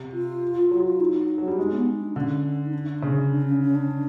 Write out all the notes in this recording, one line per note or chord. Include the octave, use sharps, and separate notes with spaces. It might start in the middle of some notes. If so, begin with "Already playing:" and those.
Already playing: C3
F4
F#3 F4
F4
D#4
F#3
G3 D4
G#3 D#4
B3
D#4
D4
D3 C#4
D#4
D4
C#3
D4
C#4
C#4
D4